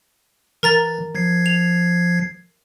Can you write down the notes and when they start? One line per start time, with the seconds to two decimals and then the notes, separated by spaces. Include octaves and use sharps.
0.63 E3 A#4 A#5 A6
1.15 F3 G#6 C7
1.46 F7